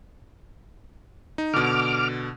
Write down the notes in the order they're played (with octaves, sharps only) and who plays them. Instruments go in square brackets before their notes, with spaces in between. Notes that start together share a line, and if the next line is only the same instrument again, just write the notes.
[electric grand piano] D#4
[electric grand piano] B2 D3 [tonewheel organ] D6 F6